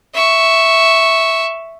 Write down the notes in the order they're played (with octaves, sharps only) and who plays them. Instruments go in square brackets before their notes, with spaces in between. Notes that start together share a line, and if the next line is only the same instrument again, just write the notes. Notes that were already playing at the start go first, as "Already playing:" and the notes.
[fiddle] E5 C#6